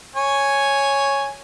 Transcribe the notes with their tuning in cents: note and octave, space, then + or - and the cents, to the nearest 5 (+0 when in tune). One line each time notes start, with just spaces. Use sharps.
C#5 +0 G#5 +0